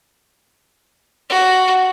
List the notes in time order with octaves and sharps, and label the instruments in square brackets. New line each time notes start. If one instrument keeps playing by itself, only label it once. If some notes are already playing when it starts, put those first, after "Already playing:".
[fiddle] F#4